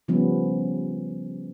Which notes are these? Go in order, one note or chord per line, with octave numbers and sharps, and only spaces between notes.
C#3 F3 G3 B3 C#4